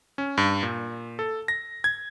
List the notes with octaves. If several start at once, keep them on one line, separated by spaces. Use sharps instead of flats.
C#4
G2
A#2
A4
A#6
G#6